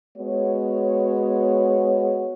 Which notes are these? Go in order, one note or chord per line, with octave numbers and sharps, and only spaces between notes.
G#3 B3 F#4 C#5